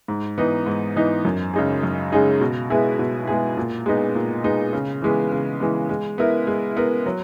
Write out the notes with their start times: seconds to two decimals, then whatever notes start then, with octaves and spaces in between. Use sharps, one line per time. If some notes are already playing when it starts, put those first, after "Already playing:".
0.08 G#2
0.38 E3 B3 D#4
0.66 G#2
0.96 E3 B3 D#4
1.25 F#2
1.54 C#3 G#3 D#4 G#4
1.83 F#2
2.12 C#3 G#3 D#4 G#4
2.41 B2
2.70 G#3 B3 E4 G#4
2.99 B2
3.27 G#3 B3 E4 G#4
3.57 A#2
3.86 G#3 B3 D#4
4.15 A#2
4.44 G#3 B3 D#4
4.73 C#3
5.02 E3 G#3 B3
5.32 C#3
5.60 E3 G#3 B3
5.89 G#3
6.18 B3 E4 A#4
6.47 G#3
6.77 B3 E4 A#4
7.06 F#3